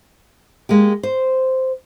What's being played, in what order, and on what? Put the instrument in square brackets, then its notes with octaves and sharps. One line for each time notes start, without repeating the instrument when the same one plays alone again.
[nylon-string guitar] G#3 A#3 G4
C5